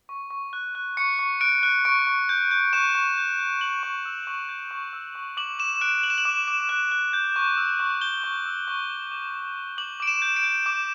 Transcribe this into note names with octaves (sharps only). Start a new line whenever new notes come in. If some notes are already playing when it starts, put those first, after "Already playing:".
C#6
C#6
F#6
F#6
C#6 C#7
C#6
F#6 D7
F#6
C#6 D7
C#6
G6
G6
C#6 E7
C#6
G6
G6
G6 F#7
C#6
E6
C#6
G6
C#6
E6
C#6
D6 F#7
D6 E7
F#6 D7
F#6 F#7
E7
F#7
D6
D6
F#6
F#6
G6
C#6
E6
C#6
G6 G7
C#6
E6
C#6
D6
D6
G6
G6
D6 F#7
D6 D7
E7
G6
D7
G6
D6